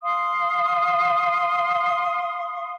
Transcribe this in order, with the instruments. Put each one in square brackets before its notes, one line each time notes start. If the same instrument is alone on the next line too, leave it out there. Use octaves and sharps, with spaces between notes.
[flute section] F5 C6 D#6